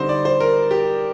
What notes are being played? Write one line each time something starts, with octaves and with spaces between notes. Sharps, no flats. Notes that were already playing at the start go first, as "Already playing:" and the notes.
Already playing: D3 G3 C4 D#4 C5
D5
C5
A#4
G4